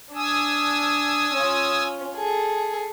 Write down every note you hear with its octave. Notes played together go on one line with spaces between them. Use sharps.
D4 G#5 D#6 E6
C#4 F4
G#4 A4